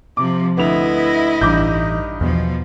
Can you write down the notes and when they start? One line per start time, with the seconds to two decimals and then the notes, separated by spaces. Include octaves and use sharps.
0.17 C3 F3 D6
0.58 D2 B3 E4 D#5 F7
1.41 A1 G2 E3 D#4 D6 G6
2.21 E2 B2 F3